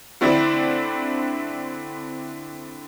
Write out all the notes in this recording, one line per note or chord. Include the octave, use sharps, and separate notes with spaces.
D3 A3 C4 D4 E4